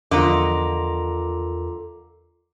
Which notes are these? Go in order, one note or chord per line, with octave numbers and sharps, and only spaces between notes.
E2 D3 F3 F4 A#4 D#5 A#5 D6